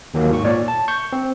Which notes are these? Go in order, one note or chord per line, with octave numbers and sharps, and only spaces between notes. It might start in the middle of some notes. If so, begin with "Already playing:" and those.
D#2 D#3 F#3 A#3
G#2 C#6
A#2 C#5 D5
A5
C#6 G6
C4